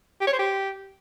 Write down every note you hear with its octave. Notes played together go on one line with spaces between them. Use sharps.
G4
C#5
C5
G4